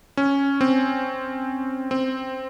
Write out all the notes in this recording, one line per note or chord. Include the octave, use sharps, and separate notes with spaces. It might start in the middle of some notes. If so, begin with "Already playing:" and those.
C#4
C4
C4